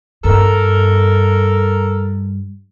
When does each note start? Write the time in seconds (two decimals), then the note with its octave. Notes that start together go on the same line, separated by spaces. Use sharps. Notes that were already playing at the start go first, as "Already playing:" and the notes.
0.24 G2 A4 A#4